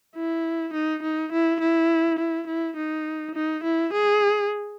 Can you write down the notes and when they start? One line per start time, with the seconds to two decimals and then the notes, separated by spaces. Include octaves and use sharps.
0.15 E4
0.73 D#4
1.03 D#4
1.32 E4
1.60 E4
2.19 E4
2.47 E4
2.77 D#4
3.35 D#4
3.64 E4
3.93 G#4